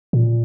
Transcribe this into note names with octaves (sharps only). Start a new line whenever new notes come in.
A#2